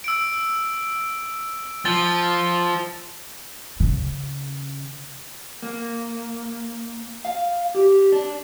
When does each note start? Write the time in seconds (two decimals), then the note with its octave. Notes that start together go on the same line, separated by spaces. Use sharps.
0.04 E6 D7
1.85 F3 A6 G7
3.80 C#3
5.62 A#3
7.25 F5
7.75 G4
8.12 D4